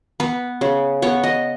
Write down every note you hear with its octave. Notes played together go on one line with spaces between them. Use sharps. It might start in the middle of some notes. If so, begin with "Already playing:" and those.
B3 B4
C#3
B3 C#5
D#5